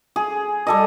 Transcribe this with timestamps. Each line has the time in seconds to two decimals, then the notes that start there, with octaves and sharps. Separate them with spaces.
0.16 G#4
0.67 G3 A4 D#5